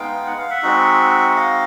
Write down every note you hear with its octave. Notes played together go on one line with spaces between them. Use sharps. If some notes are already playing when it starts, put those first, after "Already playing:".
Already playing: G#3 B3 D#4 F5 G5
F#5
F5
E5 F#5
G#3 C4 D#4 F#4
E5
D#5 F5